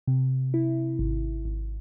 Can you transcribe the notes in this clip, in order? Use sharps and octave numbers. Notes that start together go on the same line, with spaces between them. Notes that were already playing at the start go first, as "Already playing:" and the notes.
C3
E4
G#1
G#1